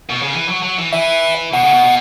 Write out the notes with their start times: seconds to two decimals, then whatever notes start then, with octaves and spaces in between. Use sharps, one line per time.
0.10 B2
0.22 C#3
0.33 E3
0.49 F#3
0.62 F#3
0.79 E3
0.93 E3 E5
1.53 B2 F#5
1.63 C#3
1.73 B2
1.83 B2